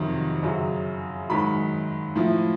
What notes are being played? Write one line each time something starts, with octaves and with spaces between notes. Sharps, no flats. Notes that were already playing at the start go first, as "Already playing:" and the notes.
Already playing: F2 C3 D#3 F#3
F#2 C#3 F#3
G#2 D#3 F#3 B5
A2 F3